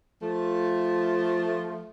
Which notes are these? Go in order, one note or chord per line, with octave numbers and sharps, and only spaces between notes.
F3 A3